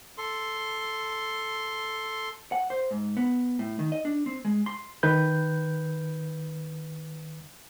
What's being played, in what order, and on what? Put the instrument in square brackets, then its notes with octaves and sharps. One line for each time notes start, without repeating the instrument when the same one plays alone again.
[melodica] A4 C6
[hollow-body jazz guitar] F#5
C5
G#2
B3
A2
D#3
D#5
D4
C4
G#3
C6
[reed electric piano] D#3 B4 G6